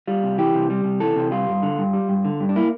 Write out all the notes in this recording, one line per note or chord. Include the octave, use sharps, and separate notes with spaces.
G3 F4
C3
E3 G4
C3
G3
C3
E3 A4
C3
G3 F4
G2
D3
G2
G3
G2
D3
G2
D4
A#3 E4